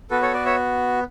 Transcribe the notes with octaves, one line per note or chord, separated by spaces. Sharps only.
B3 F#4 A4 B4
A4 C#5
B4 D5
C#5 E5